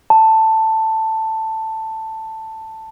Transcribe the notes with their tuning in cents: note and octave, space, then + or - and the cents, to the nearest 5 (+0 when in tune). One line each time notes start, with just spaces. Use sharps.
A5 +10